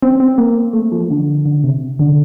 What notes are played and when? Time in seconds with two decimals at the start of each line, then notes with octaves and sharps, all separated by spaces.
0.02 C4
0.20 C4
0.38 A#3
0.73 A3
0.92 F3
1.10 D3
1.46 D3
1.64 C3
1.99 D3